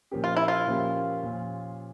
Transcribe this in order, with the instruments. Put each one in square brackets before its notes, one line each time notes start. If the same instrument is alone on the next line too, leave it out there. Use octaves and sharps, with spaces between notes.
[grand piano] A#2 F3 A#3 C#4 G4
[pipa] F4
E4
F4
[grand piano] A#2 F3 A#3 C#4 G4
A#2 F3 C#4